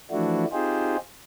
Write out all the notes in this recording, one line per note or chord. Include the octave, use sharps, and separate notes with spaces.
E3 F3 A3 D4 E4 F#4
C4 D#4 F4 G4 G#4 C5